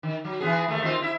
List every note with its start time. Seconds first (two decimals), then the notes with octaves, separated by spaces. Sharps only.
0.03 D#3
0.25 F#3
0.40 E3 B3 G#4
0.68 D#2 D#3 A3
0.83 D#3 C4 F4
1.02 E4 E5